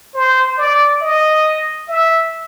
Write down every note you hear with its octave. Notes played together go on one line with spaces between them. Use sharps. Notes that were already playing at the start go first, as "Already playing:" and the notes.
C5
D5
D#5
E5